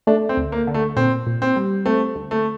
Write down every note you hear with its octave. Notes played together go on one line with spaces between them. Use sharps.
A3 D4
C4
D2
A#3
D3
A3
A#2 C4
A#2
C4
G3
A3 C4
D2
A3